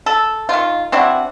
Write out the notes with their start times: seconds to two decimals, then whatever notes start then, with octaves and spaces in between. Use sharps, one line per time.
0.06 A4
0.49 D#3 F4
0.92 C4 D4 E4 F#4